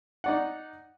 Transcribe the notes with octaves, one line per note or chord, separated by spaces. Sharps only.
D#4 D5 F#5